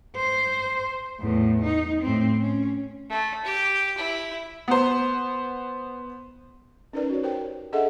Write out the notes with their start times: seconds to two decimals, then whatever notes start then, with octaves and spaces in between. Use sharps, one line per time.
0.16 C5
1.19 E2 A2
1.63 D#4
2.02 A2 C4
2.40 C#4
3.10 A3
3.45 G4
3.97 E4
4.68 B3 C5
6.93 C#4 D#4 A#4 B4 D5
7.10 F#4 C#5
7.23 G4 A#4 C5 G5
7.73 D4 G#4 A4 D#5 E5 F#5